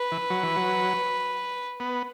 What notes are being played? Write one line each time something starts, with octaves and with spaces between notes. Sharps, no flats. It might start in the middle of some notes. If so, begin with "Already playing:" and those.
Already playing: B4
E3
F#3
E3
F#3
B3